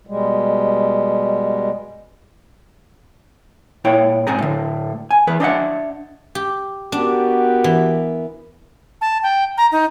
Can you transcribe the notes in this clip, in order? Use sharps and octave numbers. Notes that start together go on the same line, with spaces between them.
B2 G3 G#3
A#2 E4 C#5 G5
B1 G#2 C4 G#4 A#5
A2 D3
G#5
E3 G#4 B4
D4 D#5 E5 F#5
G4
B3 D4 F#4 G4 A#4
E3
A5
G5
A#5
D#4